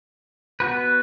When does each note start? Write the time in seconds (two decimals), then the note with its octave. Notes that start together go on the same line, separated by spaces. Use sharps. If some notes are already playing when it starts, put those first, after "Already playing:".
0.60 B3 F#4 B4